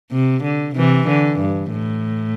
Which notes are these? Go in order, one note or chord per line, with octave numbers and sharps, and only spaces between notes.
C3
D3
C3 E3
D3
G2
A2